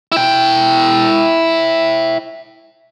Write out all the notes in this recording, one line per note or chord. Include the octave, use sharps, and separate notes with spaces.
E4 G5